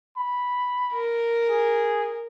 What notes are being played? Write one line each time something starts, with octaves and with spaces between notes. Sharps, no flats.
B5
A#4
G#4